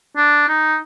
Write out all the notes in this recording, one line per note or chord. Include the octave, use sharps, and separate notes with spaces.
D4
D#4